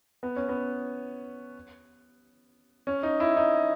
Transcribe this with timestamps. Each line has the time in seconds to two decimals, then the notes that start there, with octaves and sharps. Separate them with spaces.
0.23 B3
0.36 C#4
0.49 B3
2.87 C#4
3.03 D#4
3.20 E4
3.37 D#4